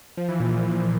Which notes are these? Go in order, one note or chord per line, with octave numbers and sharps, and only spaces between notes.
F3
E3
A#2